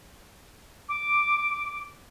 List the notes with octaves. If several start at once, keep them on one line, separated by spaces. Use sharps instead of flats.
D6